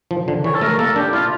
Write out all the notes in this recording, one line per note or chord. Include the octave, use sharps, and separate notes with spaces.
F3
D3
E3 C#5
A4
A3 A#4
A#3 A4
D4 G4
E4 F4